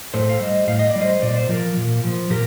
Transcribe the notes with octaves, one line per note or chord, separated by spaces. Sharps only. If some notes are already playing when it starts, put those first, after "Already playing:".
A2 A4 C5
F5
G3 C5 D#5
A2 F5
D#5
D5
G3
C5 D#5
A#2 D5
C5
F3 A#4 D5
A#2
F3
A#2 G4 A#4